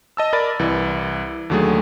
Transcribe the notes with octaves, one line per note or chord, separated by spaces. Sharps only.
D#5 A5 E6
A#4 D5 B5 A6
C2 E3
D#2 D3 F#3 A3 G#4